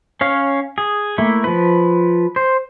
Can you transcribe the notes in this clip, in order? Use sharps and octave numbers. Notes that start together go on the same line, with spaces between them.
C#4 C#5 F5
G#4
A3 A#3 E4
F3 B4
C5